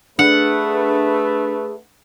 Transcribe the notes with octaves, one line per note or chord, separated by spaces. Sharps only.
A3 D4 G#4 B4 F#5